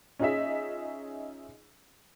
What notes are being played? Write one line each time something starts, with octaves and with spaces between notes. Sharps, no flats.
C#4 D#4 F4 G#4 D#5 E5